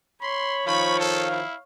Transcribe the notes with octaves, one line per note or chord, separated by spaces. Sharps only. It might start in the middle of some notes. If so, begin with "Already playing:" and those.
C#5 B5 C6
D#3 F3 B5 C#6
A4 F5
E4